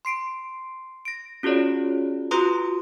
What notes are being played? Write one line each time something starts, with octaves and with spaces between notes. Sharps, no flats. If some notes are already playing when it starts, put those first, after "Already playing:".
C6 C7 D7
A#6 D7
C#4 F4 F#4 G#4 C#5 D5
F4 F#4 B4 A#5 C6 D#6